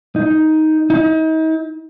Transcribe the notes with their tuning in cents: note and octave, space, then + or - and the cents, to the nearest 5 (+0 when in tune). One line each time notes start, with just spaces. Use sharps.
D#4 +10
D#4 +40